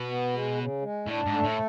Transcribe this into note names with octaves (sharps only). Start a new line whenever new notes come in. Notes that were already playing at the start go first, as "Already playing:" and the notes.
Already playing: B2
B3
G#3
C#3
G#3
A2 D4
G#2
A3
A2